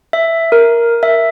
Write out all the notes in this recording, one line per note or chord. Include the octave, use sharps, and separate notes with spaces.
E5
A#4
E5